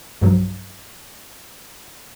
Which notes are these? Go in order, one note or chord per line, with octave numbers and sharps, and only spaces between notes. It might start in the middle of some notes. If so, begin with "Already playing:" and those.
B1 G2 F3 F#3